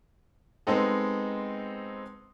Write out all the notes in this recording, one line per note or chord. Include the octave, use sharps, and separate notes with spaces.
G#3 B3 C4 D#4 A4